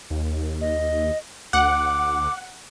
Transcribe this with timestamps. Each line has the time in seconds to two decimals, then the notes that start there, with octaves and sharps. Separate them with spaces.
0.10 D#2
0.61 D#5
1.53 D2 F#5 D6